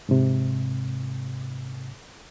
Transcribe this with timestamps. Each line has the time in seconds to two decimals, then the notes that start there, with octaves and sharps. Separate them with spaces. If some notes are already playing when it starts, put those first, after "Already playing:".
0.09 G#2 C3